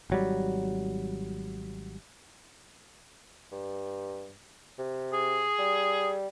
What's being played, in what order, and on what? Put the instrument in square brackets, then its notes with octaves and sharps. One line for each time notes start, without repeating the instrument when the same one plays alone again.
[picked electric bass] G#1 F#3 G3
[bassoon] G2
C3
[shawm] G#4
[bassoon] G3